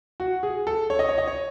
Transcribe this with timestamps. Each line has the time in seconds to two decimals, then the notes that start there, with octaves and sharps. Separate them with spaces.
0.20 F#4
0.43 G#4
0.67 A4
0.90 C#5
0.99 D#5
1.09 C#5
1.18 D#5
1.28 C#5